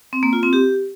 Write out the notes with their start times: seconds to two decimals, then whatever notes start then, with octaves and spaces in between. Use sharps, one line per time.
0.13 C4
0.23 A#3
0.33 F4
0.43 C4
0.53 G4